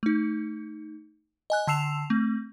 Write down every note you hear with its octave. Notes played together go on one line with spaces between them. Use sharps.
A3 D#4
D#5 G#5 F#6
D3 A5 E6 C7 E7 F7
A3 C4